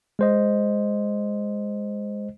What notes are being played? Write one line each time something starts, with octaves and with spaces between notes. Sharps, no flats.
G#3 C5 D#5